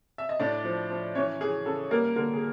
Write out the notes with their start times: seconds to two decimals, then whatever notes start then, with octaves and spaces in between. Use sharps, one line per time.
0.18 E5
0.29 D#5
0.40 A2 D4 D5
0.65 F3
0.90 F3
1.15 E3 C#4 C#5
1.40 E3 G#4
1.66 C#3 A4
1.91 G3 A#3 A#4
2.16 D3 A#3 A#4
2.34 G#4